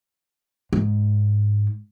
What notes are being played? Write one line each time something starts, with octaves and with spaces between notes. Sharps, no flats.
G#2